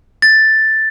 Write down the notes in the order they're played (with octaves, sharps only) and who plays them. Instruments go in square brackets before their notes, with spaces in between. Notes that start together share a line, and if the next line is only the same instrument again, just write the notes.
[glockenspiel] A6